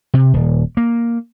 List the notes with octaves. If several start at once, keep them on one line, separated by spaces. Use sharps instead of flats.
C3
D#1
A#3